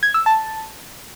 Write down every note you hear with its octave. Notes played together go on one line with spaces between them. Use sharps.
G#6
E6
A5